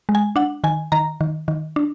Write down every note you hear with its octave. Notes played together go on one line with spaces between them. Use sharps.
G#3
G#5
D4 F#5
D#3 G#5
D#3 A#5
D#3
D#3
D4